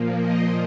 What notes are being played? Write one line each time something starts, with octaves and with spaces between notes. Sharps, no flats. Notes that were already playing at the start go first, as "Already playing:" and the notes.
Already playing: A#2 F3 A#3
D#5